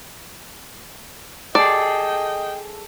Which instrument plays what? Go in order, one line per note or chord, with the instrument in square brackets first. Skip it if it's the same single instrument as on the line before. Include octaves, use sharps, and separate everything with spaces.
[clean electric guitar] G#4 A4 [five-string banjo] D5 [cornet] D#5 [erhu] G5